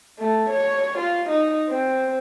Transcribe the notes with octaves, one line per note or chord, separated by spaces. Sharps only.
A3
C#5
F4
D#4
C4